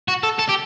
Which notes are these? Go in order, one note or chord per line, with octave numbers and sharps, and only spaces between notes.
F#4
A4
A4
G4